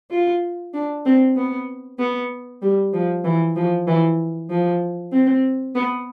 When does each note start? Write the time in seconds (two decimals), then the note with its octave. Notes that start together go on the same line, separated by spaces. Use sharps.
0.11 F4
0.74 D4
1.05 C4
1.36 B3
1.99 B3
2.62 G3
2.93 F3
3.24 E3
3.56 F3
3.87 E3
4.50 F3
5.12 C4
5.75 B3